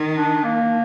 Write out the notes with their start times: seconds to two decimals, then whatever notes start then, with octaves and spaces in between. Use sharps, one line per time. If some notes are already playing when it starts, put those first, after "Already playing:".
Already playing: D#3
0.17 D4
0.44 A#3